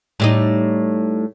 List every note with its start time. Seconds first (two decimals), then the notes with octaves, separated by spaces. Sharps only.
0.20 A2 G3 D#4